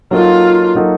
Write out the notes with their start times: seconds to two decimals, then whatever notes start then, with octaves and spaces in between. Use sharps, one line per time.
0.11 F#3 A#3 D#4 F4 F#4 A4
0.75 F#3 A#3 D#4 F#4 A4